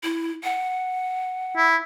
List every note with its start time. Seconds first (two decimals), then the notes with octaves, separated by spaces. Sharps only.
0.03 E4
0.43 F#5
1.57 E4